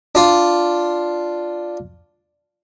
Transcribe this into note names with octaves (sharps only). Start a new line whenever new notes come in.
D4 F4